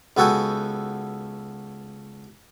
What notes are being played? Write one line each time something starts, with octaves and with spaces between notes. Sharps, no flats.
C#2 B3 F#4 A4 G5 G#5